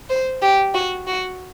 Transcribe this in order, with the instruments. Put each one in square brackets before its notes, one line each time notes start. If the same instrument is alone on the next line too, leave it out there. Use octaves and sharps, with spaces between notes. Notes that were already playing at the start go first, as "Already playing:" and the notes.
[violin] C5
G4
F#4
F#4